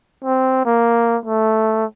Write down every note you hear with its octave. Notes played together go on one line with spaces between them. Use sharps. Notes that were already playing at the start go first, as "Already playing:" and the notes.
C4
A#3
A3